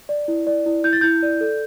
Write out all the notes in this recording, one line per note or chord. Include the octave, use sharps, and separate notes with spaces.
D5
E4
D5
E4
E4 G6
A6
E4 G6
D5
A4